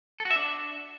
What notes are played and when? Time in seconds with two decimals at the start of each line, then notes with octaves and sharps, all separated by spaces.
0.20 A4
0.25 F#4
0.31 E5
0.36 D4